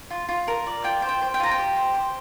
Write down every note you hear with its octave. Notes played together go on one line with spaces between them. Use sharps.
F4
F4
A#4
D5
F4 G5
C5
G5
C5
G5
F4 A#5
G5
G4
C5
C5